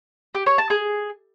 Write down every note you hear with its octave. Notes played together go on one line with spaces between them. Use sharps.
G4
C#5
A5
G#4